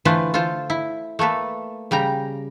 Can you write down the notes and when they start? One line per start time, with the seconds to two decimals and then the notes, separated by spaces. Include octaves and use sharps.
0.05 D3 E3 A3 F4 B4 C5
0.34 F4 A4 C5
0.70 E4
1.19 A3 A#3 A4 B4
1.91 C#3 G3 G5 A#5